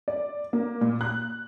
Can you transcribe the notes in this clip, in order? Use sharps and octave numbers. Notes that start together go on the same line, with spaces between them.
D5
A#3
A#2
F#6